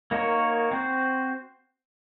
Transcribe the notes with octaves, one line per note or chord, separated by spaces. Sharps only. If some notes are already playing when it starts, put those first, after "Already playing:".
A#3 D#4 F#4 A#4 C#5
C4 F#4 C5